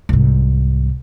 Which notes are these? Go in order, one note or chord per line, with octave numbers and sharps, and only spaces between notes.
C2 G#2